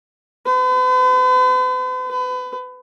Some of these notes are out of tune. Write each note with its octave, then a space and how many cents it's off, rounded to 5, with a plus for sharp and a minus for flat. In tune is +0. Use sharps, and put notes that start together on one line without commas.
B4 +45
B4 +30